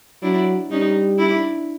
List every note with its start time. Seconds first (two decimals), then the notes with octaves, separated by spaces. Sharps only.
0.22 F#3 D4 E4
0.70 G3 C#4 D#4
1.18 D4 E4